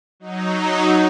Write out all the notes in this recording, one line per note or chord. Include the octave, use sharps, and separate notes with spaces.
F#3 D#4